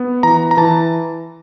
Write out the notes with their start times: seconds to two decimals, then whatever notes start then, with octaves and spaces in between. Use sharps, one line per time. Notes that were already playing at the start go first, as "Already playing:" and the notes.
Already playing: B3
0.23 E3 A#5
0.51 A#5
0.57 E3 A5